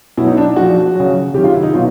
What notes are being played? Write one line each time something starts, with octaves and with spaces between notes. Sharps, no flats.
B2 F#3 E4
D#4
D4
A#2 F3 F#4
C#3 F#3
C3 D#3 F#3 G4
F4
E4
D#4
B2 F#3 F4